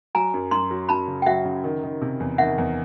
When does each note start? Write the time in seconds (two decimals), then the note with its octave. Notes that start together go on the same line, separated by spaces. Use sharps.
0.15 F#3 G#5 A#5
0.34 F#2
0.51 F#2 A#5 C6
0.70 F#3
0.89 F#2 A5 B5
1.08 C#3
1.22 G5
1.26 F#3 E5 F#5
1.45 C#3
1.64 D#3
1.83 D#3
2.02 C3
2.20 E2
2.38 D#3 E5 F#5
2.58 E2